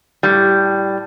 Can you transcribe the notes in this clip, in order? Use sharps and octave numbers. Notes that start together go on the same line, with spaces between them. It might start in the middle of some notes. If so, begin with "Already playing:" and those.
A2 G3